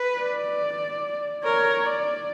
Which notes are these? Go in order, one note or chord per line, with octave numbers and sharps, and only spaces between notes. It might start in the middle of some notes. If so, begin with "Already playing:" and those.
Already playing: B4
D5
A#4 C#5
D5